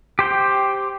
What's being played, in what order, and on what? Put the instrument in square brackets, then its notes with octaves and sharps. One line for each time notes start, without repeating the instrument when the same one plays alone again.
[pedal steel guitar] G4 C5 G5